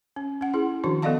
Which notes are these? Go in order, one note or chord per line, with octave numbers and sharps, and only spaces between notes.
C#4
C#4 F#5
E4 G#4
D#3 F3 D4 F#4
B3 A4 D5 D#5 F5 A5